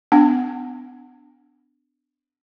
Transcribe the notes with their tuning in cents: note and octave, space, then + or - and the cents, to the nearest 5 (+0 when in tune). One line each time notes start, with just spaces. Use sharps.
B3 +35 D4 +0 F#5 +0